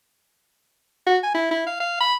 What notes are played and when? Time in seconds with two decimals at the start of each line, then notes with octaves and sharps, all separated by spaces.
1.06 F#4
1.23 G#5
1.34 E4
1.51 E4
1.67 F5
1.80 F5
2.00 B5